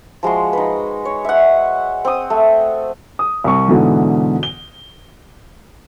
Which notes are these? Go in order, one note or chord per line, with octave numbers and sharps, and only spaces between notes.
F3 G#3 F#4 C6
D#4 B4
C#5
E5 F#5
C4 D#6
A3
D#6
C2 C#6
G#2 B2 D3 E3
G7